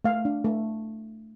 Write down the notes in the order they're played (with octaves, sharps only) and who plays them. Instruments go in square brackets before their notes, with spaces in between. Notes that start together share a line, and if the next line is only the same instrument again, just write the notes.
[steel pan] A3 F5
D4
A3